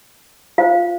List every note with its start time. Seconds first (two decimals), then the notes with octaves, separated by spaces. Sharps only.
0.58 F4 C5 F5